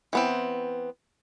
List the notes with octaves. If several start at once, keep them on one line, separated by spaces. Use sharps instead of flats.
E3 B3 C4